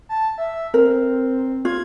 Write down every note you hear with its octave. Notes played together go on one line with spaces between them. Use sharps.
A5
E5
C4 A#4
F4 G#6